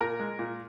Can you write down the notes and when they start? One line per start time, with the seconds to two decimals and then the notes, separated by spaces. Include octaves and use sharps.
0.01 A#2 A#4
0.20 G#3
0.39 A#2